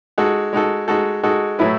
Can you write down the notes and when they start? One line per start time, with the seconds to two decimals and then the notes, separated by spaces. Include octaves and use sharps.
0.18 G#3 D#4 F#4 A4
0.53 G#3 D#4 F#4 A4
0.88 G#3 D#4 F#4 A4
1.23 G#3 D#4 F#4 A4
1.59 A2 F#3 A3 E4 B4